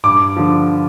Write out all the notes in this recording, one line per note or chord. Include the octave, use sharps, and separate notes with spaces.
G2 D6
D3 F3